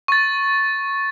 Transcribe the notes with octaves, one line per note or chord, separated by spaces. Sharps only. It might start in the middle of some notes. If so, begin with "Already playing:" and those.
C#6 A6